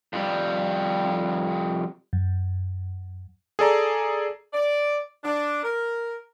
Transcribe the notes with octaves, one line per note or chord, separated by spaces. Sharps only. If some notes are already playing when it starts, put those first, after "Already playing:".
F2 G3
F#2
G#4 A4 D5 A#5
D5
D4
A#4